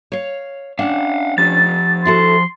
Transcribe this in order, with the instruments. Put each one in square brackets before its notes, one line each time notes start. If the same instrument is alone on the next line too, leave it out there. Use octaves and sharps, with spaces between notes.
[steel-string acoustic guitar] C#5 F5
[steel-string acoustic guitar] C#4 D4 [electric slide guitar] F5 F#5
[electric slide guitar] F3 G4 [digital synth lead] A6
[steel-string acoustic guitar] E4 F#4 A4 [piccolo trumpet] C6